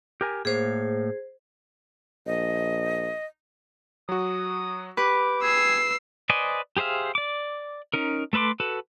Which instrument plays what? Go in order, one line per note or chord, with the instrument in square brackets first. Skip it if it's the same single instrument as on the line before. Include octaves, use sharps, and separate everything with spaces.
[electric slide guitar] G4 A#4 G#5
[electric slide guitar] A2 A#3 C#5 [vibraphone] G#4 C5
[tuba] A#1 [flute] D#5
[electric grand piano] F#3 F#4 [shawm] D#6
[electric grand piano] G4 [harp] B4 [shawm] D6
[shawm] G#4 [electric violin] E6 C7
[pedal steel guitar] B4 C5 D5 D#5 G#5
G4 G#4 C5 E5 F5
D5 D6
C#4 D#4 A#4
A3 A4 B4 C6 D6
F#4 A4 B4